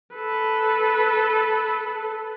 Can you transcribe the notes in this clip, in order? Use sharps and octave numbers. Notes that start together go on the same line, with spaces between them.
A4 B4